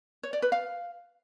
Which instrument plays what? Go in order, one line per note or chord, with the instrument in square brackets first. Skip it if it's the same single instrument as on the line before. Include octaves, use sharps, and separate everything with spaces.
[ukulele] C#5
D5
B4
F5